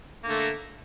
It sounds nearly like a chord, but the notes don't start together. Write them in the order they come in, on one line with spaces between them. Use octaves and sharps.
A#3 D3 A3